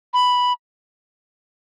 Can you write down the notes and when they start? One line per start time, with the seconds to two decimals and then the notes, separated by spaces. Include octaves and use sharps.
0.13 B5